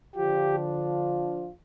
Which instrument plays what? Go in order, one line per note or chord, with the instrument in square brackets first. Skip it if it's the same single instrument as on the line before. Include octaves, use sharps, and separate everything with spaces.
[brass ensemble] D3 F3 D4 F4 [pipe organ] G4